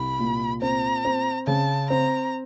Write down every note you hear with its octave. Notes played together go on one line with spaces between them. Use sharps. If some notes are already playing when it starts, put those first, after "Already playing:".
Already playing: C2 B5
A#2
C4 A#5
C4
C#3 A5
C4 A#5